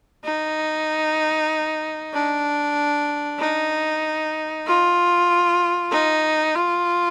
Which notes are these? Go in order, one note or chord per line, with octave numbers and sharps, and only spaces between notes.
D#4
D4
D#4
F4
D#4
F4